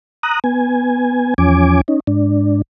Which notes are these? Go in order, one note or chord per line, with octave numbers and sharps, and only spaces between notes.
A#5 D#6 F#6
B3 G#5
E2 F3 C#4 G#5 D6
C#4 D#4
G#2 D4